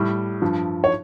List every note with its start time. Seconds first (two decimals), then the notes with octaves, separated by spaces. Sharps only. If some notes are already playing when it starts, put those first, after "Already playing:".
Already playing: A2 G3
0.42 G2 F3
0.84 C#5